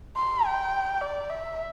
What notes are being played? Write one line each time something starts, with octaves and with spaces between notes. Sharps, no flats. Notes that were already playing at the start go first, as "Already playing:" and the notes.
C6
G5
D5
E5